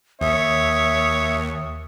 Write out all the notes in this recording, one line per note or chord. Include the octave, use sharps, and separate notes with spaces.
D#2 C#5 E5 D#6